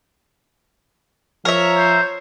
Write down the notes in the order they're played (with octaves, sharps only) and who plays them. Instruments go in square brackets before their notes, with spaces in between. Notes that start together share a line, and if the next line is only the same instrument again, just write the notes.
[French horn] F3 [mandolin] A#4 E5 [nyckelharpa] C#5
[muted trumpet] C5